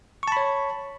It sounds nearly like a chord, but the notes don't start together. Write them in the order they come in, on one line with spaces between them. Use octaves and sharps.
C#6 A5 B5 C#5